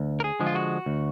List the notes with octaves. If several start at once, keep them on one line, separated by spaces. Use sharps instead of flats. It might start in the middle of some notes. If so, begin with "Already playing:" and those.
Already playing: D2
A#4
G#4
D3 F3 G#3
F4
F#4
D2